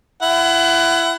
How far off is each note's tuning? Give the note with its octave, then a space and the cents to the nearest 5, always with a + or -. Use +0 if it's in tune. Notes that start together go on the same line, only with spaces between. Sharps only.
E4 +30 F#5 +20